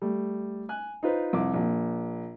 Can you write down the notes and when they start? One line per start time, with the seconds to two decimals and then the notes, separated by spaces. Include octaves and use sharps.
0.02 G3 A3
0.69 G#5 F#6
1.03 D#4 F4 B4 C5
1.33 C2 F2 D6
1.54 A#1 A#2